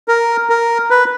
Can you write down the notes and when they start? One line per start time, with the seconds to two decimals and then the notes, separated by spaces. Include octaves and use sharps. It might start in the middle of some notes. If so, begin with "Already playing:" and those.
0.08 A#4
0.50 A#4
0.90 B4